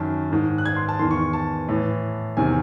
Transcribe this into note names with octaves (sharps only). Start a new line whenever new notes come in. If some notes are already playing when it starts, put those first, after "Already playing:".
Already playing: F#2 D#3 A5
G#2 D#3
F#6
G#6
C6
A5
E2 D#3 C6
C#6
A5
A2 E3
E2 C3 D#3 G#5